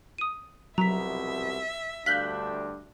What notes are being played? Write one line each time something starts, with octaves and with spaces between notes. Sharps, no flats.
D#6 D#7
C2 F2 B2 F#3 E5 A#5 B6
D2 G2 D4 F5 F#6 G6 B6